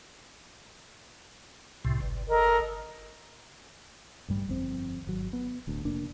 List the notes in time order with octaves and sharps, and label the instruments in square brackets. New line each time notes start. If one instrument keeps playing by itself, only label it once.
[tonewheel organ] C2 A2 C3
G1
[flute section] A4 A#4 D#5
[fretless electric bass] A1 G2 G3
G1 F2 C4
G#1 F#3
B3
D1 D2
F1 A#3 D4